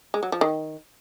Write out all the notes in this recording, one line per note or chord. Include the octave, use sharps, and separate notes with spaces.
G#3
F#3
F3
D#3